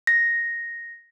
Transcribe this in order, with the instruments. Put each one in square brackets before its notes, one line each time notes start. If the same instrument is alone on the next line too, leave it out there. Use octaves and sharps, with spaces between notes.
[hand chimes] A#6